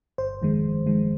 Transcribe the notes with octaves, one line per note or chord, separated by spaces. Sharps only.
G1 C5
F2 D#3 G#3
G1
F2 D#3 G#3